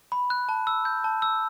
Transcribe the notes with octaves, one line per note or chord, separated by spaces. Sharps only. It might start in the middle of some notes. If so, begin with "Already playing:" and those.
B5
F#6
A5
E6
G6
A5
E6